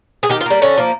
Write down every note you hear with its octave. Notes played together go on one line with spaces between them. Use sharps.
G#4
D#3 G4
F4
G3 A#3
D3 C#4
F3 A#3